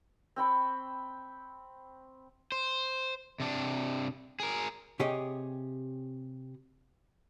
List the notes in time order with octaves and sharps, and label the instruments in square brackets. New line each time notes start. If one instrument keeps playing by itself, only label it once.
[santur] C4 G5 B5 C#6
[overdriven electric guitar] C5
C3 D4
G#4 A#4
[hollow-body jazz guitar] C3 G4 G#4 C#5 D#5